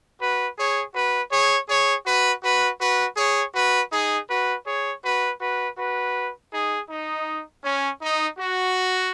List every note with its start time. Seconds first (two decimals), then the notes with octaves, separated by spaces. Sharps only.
0.20 F#4 B4
0.57 G#4 C#5
0.94 F#4 B4
1.31 G#4 C#5
1.68 G#4 C#5
2.05 F#4 B4
2.43 F#4 B4
2.80 F#4 B4
3.17 G#4 C#5
3.54 F#4 B4
3.92 D#4 G#4
4.29 F#4 B4
4.66 G#4 C#5
5.03 F#4 B4
5.40 F#4 B4
5.78 F#4 B4
6.52 D#4 G#4
6.89 D#4
7.64 C#4
8.01 D#4
8.38 F#4